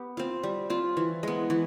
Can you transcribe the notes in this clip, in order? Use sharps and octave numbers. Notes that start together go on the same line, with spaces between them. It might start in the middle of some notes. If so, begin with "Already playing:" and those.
Already playing: B3 G4
C4 F4
G3
C4 F4
E3
G#3 B3
E3